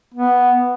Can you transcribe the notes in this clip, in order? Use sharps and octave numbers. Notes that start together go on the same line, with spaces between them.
B3